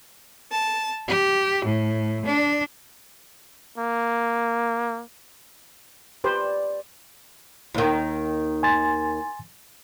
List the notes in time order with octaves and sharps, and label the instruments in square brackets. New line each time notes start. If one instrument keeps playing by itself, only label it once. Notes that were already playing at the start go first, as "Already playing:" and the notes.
[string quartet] A5
G4
A2
D4
[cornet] A#3
[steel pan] G4 B4 C5 [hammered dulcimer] D5
[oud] D#2 D#3
[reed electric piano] G#5 C6 A6